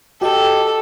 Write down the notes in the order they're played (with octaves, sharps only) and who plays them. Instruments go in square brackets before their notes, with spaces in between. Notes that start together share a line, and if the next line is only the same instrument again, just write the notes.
[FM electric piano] F#4 D#5 [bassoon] G4 [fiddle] A4